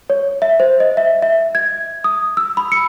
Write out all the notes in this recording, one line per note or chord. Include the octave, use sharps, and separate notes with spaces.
C#5
E5
C5
D#5
E5
E5
G#6
D#6
E6
B5
C#7